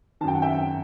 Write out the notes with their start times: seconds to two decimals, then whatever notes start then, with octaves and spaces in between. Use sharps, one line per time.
0.21 D#3 A5
0.24 F#2 G5
0.35 F#5
0.42 E5 G5